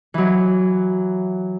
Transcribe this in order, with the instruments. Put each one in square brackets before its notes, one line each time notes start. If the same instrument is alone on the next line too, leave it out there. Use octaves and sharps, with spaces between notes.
[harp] E3 F#3